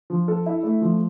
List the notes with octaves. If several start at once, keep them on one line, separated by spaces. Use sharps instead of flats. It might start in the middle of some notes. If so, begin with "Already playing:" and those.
F3
A4
E4
A3
F3